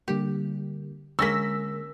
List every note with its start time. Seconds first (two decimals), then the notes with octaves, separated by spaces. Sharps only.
0.08 D3 G3 A#3 G4
1.19 D3 G#3 A#3 C#4 E6 A#6 B6